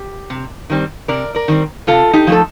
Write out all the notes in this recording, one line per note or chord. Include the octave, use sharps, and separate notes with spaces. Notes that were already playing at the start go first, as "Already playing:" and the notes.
Already playing: G4
C3
D#3 G3 C4
C3 A#4 D5
A#4 D5
D#3 G3 C4
C3 F4 A4
D#4 G4
F3 A3 A4